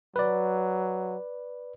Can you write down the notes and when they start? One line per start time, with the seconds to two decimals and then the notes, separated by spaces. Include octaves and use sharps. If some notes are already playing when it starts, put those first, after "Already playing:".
0.16 F#3 B4 D5